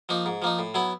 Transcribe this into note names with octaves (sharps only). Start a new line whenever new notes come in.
F3 A#3 D#4
G#2
F3 A#3 D#4
A2
F#3 B3 E4